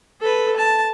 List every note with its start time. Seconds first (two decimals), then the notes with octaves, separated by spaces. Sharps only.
0.20 A4 B4
0.57 A5